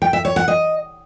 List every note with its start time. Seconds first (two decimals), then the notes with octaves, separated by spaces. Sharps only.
0.02 G5
0.13 E5
0.25 C#5
0.36 F#5
0.48 D#5